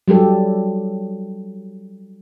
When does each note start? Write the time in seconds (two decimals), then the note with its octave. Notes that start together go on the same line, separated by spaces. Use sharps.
0.08 F#3 G3 G4 A4